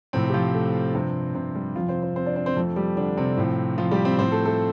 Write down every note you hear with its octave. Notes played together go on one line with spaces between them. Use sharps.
A2 C3 F3 C4
G4
F3 F4
A3
G2 C3 F3 C4
C3 C4
G3
F2 C3 F3 F4
C4 C5
C4 C5
C4 C5
D4 D5
C4 C5
C4 C5
F2 F3 A3 A4
G3 G4
D3 D4
C3 C4
A2 F3
F3 F4
G3 G4
C4 C5
A2 F3 C4 C5
A3 A4
A3 A4